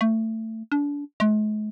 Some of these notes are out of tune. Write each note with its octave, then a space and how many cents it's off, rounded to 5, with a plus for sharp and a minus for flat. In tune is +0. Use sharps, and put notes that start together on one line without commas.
A3 +20
D4 -30
G#3 +45